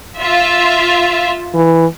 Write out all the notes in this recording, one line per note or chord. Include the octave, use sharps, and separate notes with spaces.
F4 E5
E3